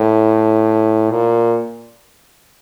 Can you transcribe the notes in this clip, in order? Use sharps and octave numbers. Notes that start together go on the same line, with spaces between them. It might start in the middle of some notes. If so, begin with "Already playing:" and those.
Already playing: A2
A#2